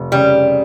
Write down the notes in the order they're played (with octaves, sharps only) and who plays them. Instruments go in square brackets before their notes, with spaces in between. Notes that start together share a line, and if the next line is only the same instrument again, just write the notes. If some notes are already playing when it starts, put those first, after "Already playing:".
Already playing: [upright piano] F1
[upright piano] C#3 [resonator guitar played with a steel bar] G3